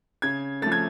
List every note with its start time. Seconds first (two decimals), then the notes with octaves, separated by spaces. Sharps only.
0.22 C#3 G#6
0.62 F3 A3 A6
0.72 G#6